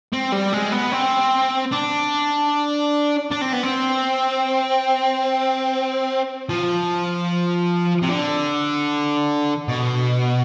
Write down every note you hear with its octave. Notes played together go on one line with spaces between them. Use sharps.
C4
G3
G#3
B3
C4
D4
D4
C4
B3
C4
F3
C3
D3
B2